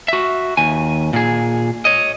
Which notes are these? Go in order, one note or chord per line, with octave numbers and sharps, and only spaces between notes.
F#4 E5
D#2 G#5
A#2 G#4
C#5 D#5